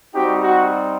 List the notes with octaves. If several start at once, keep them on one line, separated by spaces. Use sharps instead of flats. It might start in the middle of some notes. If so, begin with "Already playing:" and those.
G3 C4 D#4 F#4 G4 G5
F#4 F#5